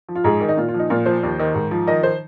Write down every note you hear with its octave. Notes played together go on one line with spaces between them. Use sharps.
F3
F4
G#2 G#4
D#3
D#4
A#2 F4
F4
F3
D#4
A#2 F4
F3 C5
D#2
D#3
G#2
F3
D#3 D#5
C5